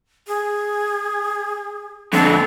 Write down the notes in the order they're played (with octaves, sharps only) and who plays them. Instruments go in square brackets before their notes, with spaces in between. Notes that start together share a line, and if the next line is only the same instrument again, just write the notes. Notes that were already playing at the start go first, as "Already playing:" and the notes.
[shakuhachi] G#4
[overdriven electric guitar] F2 D3 [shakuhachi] A4